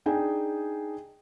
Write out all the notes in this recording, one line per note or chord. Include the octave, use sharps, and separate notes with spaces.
D4 D#4 G#4 G5 G#5